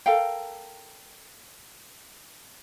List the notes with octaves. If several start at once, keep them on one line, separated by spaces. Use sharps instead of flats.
A4 A#4 F5 G5